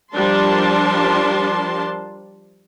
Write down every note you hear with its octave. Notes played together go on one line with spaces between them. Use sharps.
F3 G3 D4 A#4 A5 C6